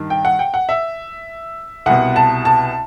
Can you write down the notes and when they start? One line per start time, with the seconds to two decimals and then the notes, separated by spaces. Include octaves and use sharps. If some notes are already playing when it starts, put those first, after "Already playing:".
Already playing: G2 D#3
0.10 G5
0.25 F#5
0.39 G5
0.54 F#5
0.69 E5
1.86 C2 B2 F#5
2.16 A5
2.45 A5